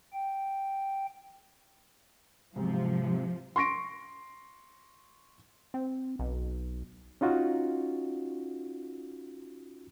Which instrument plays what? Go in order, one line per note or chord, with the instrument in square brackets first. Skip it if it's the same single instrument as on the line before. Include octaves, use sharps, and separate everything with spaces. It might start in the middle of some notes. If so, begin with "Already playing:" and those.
[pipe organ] G5
[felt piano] B1 G#2 [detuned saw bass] C3 [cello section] F3
[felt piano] C6 C#6 A#6 D7
[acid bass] C4
B1
[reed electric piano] C#4 D#4 F4 F#4